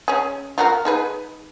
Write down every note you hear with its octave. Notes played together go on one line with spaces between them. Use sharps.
C#4 G#4
F4 F#4 A#4
D#4 G#4 B4